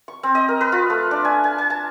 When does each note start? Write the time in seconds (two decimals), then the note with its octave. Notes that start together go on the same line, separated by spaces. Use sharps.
0.08 C#6
0.23 C4
0.35 D#5
0.49 A#4
0.61 B4
0.72 F4
0.90 A3
1.11 D4
1.25 G#5
1.44 G#5
1.58 G#5
1.70 A5